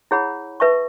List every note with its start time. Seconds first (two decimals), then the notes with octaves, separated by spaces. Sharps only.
0.11 E4 G#4 C#5 F#5 B5
0.60 B4 E5 A5 C#6